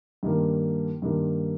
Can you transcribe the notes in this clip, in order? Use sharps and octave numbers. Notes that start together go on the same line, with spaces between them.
G2 D#3 A#3
G2 D#3 A#3